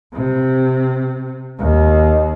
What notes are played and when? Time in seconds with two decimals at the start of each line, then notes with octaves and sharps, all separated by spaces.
0.13 C3
1.59 D#2